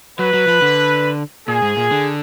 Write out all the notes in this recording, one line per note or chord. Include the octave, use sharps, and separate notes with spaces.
F#3 B4
F#3
F3
D3
A#2 G#4
G#2
A#2
D3